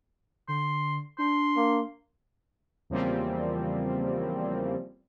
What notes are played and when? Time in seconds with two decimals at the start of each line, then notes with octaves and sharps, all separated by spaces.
0.48 D3 C6
1.18 D4 C6
1.56 A#3
2.90 E2 C#3 F3 G3 A#3 C4